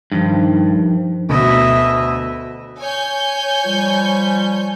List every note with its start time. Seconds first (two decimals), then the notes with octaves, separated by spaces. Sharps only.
0.12 G2 D#3 F3 D#4
1.29 D2 B2 D#5 E5
2.79 C#5 G#5 G6
3.65 F3 G3